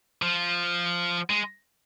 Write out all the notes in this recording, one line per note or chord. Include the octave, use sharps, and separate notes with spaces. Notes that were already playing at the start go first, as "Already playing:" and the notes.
F3
G#3